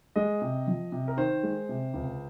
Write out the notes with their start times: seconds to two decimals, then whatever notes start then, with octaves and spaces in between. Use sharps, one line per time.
0.16 G#3 D#5
0.42 C3
0.67 F3
0.92 C3
1.08 A#4
1.17 D#3 C5
1.43 G#3
1.69 C3
1.94 C#2